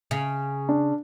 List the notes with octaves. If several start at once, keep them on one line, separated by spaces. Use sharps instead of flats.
C#3
D4